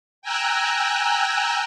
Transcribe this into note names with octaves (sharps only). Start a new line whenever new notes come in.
G5 G#5 A#5 E6 F#6